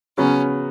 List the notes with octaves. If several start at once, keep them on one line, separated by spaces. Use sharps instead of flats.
C#3 F#3 B3 C#4